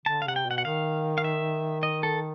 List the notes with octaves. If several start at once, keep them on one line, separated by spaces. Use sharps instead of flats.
D3 A5
F5
C3 F#5
G5
B2 F#5
F#5
D#3 F5
F5
E5
D#5
A4